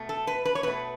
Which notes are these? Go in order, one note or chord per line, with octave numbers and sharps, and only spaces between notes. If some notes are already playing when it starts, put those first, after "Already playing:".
Already playing: B2 A3
A4
B4
B4
C#5
B2 A3 B4